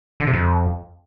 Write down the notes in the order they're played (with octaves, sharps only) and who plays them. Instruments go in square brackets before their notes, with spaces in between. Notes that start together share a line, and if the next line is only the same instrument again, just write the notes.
[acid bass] D3
C3
F2